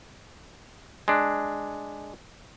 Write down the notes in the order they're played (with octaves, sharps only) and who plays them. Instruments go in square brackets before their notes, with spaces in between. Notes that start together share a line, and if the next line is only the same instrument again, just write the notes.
[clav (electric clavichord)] G#3 D4